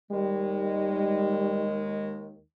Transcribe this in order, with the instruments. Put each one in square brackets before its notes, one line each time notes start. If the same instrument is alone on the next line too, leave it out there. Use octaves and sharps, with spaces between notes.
[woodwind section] D#2 D#3 G#3 [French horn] G3